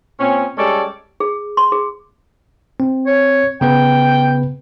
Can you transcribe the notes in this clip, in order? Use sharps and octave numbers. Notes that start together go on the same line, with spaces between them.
A#2 C4 C#4
G3 G#3 C#4 A4 D5
G#4
C6
G#4
C4
C#5
C#3 B3 B4 G5